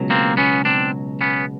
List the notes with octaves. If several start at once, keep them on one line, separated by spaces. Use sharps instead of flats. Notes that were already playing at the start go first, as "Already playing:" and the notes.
Already playing: C#2 B2 F#3
A#3 C4
B3 C#4
C4 D4
B3 C#4